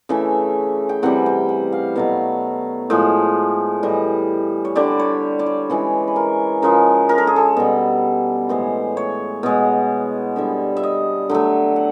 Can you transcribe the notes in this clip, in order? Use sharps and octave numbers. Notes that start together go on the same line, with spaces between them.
C#3 E3 A3 E5
G5
C3 E3 G3 F#5
G5
F#5
F5
B2 F#3 A3 F5
A2 F3 G#3
A2 E3 G3 D#5
C#5
D3 G3 D5
C#5
D5
C#5
C#3 E3 G#3 B4
B4
A#4
C#3 F3 G#3 A#4
A#4
A4
G#4
A4
B2 G3
A2 E3 G#3 C5
C#5
B2 G#3
D3 G3 E5
E5
D#5
D3 F#3 A3 E5
F#5